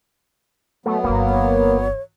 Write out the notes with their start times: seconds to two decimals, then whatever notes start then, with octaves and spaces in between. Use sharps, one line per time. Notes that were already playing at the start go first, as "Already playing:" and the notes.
0.86 F#3 A3 B3
1.04 G1 E3 A#3
1.30 C#5